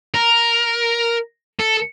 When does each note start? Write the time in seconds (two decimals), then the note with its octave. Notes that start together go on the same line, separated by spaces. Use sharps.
0.15 A#4
1.60 A4